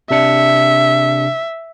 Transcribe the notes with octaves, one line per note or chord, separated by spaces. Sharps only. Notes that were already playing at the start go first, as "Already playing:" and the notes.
C3 D4 E5 C#7